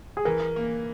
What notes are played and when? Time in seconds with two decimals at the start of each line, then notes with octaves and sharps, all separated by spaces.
0.17 G#4
0.25 E3 A#4
0.56 A#3